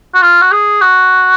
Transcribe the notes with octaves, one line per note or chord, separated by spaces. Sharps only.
F#4
F4
F#4
G#4
F#4